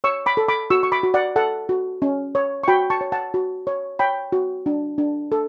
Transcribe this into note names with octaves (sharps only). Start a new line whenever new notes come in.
C#5 C#6 E6
B5 D6
A4
B5 D6
F#4 C#6 E6
C#6
B5 D6
F#4
D5 F#5
A4 F#5 A5
F#4
C#4
C#5
C#6
F#4 G5 B5
A5 C#6
C#5
F#5 A5
F#4
C#5
C#5 G5 B5
F#4
D4
D4
A4